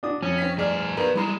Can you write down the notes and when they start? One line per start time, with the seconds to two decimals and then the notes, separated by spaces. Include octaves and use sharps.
0.03 D4 F#4 D#6
0.23 F2 C#4
0.38 C4 B6
0.58 G2 G#3 G#4 D5 F6
0.97 B3 A#4 B4 D5
1.15 G3 G#3 E4 A#5 E7